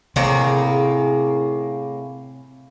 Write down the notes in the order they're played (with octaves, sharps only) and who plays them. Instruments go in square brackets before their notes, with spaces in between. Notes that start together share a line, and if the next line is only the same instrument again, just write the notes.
[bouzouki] A2 A#3 G#4 [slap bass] C3